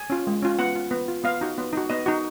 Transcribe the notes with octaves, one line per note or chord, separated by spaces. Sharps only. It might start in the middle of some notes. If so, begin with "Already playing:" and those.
Already playing: G#5
C#4 F4
G#3
C#4 F4
B3 F#5
F4
B3
F4
B3 F5
D#4 F#4
B3
D#4 F#4
B3 D#5
D#4 F#4